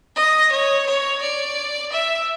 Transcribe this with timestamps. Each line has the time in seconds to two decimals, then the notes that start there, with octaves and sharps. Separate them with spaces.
0.16 D#5
0.52 C#5
0.86 C#5
1.21 D5
1.92 E5